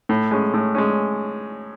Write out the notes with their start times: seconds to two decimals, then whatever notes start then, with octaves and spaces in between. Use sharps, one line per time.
0.09 A2
0.31 G#3 C#4
0.54 A2
0.75 G#3 C#4